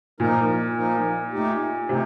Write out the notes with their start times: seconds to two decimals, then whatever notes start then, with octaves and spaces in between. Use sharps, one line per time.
0.20 A#2 F3 A#3 D#4 A#4
0.76 F3 A#3 D#4 A#4
1.32 A3 D#4 G4
1.89 C3 A3 D#4